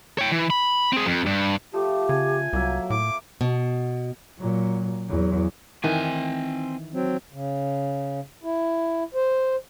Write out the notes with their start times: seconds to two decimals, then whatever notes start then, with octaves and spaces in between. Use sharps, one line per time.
0.18 C#5 G5
0.32 E3
0.50 B5
0.93 C4 G#4
1.05 F2
1.26 G2
1.73 F3 A3 G4
2.09 C#3 G#5
2.53 C2 F#3 A#3 E5
2.90 A2 D6
3.41 B2
4.39 A#2 F#3
5.09 E2 F#3
5.84 D#3 E3 C4 G#5
6.94 F#3 C4
7.33 C#3
8.44 E4
9.14 C5